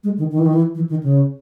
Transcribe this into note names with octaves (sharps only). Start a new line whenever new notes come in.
G#3
D#3
D#3
E3
D#3
E3
E3
D#3
C#3